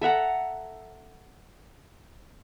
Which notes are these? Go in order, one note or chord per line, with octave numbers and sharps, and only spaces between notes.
A4 E5 F#5 A#5